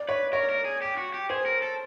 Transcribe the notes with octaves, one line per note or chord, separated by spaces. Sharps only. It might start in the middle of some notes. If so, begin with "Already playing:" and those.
Already playing: D5
B4 C#5
A#4 C#5
A#4
G#4
G4
F#4
G4
G#4 C5
A#4
A4